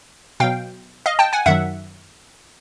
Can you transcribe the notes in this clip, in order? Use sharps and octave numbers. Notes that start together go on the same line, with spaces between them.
B2 F#3 F5 G5
D#5 F5
G5 A5
F#5 G#5
F#2 D#3 F#3 E5 F#5